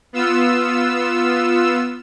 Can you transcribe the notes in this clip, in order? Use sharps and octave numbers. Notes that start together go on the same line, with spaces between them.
B3 F4 E6